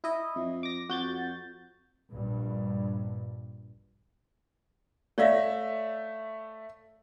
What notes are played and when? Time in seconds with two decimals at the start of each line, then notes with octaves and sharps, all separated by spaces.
0.04 E4 D#5
0.35 F2
0.63 D6 A#6
0.89 F2 F#4 G6 A6
2.12 A#1 G2
5.18 A3 C#5 D5 E5 F5 A#6